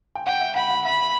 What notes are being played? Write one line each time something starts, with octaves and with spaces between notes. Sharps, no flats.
G5
F#5 G5
E5
F#5 B5
F#5
E5 B5